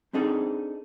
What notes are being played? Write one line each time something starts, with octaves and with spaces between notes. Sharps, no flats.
C4 D4 D#4 G#4 A4